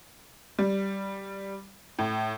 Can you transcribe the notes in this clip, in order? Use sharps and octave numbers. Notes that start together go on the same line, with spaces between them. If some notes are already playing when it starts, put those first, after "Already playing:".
G3
A2